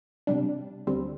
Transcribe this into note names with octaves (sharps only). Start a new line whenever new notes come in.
C3 G3 D4
D2 D3 G3 C4